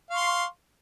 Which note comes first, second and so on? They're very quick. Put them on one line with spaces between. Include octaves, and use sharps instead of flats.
F5 C#6 C6